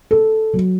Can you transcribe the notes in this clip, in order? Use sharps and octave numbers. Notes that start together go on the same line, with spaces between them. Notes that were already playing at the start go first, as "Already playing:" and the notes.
A4
F#3